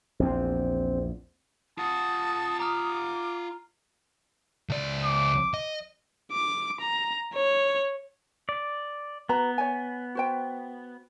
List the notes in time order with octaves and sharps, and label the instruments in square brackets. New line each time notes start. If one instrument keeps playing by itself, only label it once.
[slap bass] A#1 E2 [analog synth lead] C4
[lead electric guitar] F4 F#5 [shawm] A5 [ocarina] D#6
[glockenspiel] A#5 F6 [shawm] D6
[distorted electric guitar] C#2 D5
[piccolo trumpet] D6
[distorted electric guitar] D#5
[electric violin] D6
A#5
C#5
[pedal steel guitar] D5
[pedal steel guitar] B3 [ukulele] F#4 B4 A#5
[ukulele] C#5 G#5
F#4 C5 G5